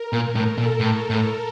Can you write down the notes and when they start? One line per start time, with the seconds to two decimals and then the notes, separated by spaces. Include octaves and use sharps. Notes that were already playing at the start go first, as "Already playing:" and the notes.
Already playing: A#4
0.13 A#2
0.20 A#4
0.35 A2
0.50 A4
0.58 A#2
0.80 A2
1.10 A2